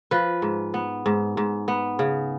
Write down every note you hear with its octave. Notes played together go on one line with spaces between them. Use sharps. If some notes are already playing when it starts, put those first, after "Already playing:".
F3 B4
G#2
B3
G#2
G#2
B3
C#3